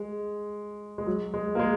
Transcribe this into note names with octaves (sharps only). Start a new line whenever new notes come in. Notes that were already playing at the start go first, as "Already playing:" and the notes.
Already playing: G#3
G#3
F#3
G#3
A#3
G#3